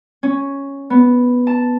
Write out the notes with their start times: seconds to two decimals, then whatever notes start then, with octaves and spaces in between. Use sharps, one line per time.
0.23 C#4
0.90 B3
1.47 A5